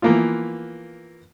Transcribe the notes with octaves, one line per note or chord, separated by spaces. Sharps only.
E3 F3 A#3 B3 F4